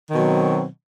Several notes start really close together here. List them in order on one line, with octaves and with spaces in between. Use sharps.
D#3 B2 F#3 C4